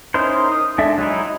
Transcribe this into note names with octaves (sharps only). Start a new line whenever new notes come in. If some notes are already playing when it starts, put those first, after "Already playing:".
C#4 D#4 E4 A#4 C5
D#6
G#3 D4 A4 E5
F#3 G#3 D#4 E4